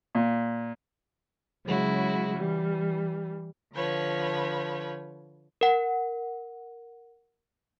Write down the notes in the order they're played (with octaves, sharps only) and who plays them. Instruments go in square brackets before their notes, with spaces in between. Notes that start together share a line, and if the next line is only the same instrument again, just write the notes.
[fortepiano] A#2
[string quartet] C#3 F#3 G#3 E4 F#4
E3 G3
D3 F3 B4 C#5
[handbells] A#4 F#5